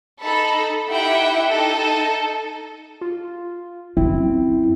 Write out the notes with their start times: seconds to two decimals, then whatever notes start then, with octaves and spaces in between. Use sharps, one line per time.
0.22 D#4 A4 B5
0.87 D#4 E4 G4 E5 F#5 G5
1.47 D#4 A4
3.01 F4
3.97 F#2 C4 E4